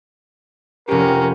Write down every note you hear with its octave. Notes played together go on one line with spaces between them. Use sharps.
F1 C#4 G4 A#4